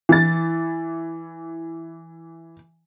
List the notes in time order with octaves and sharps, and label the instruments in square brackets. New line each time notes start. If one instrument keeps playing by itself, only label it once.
[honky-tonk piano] E3 A6